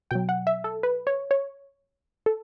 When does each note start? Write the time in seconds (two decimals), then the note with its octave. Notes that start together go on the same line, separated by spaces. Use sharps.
0.11 B2 F#3 G5
0.29 F#5
0.47 E5
0.64 A4
0.83 B4
1.07 C#5
1.31 C#5
2.26 A4